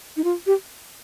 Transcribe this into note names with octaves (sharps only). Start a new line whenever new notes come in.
D#4
F4
G4